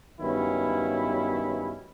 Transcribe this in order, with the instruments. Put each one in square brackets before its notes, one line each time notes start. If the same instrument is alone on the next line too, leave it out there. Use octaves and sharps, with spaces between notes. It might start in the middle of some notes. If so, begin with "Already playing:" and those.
[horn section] G2 D#3 F#3 B3 C#4 E4